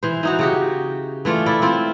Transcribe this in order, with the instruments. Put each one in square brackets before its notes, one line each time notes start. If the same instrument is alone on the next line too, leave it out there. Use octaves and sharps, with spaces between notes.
[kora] E3 C5
E3 D#4 F#4
C#3 F#4 G4
E3 A3 F4 D5
E4 D5
C4 E4 F4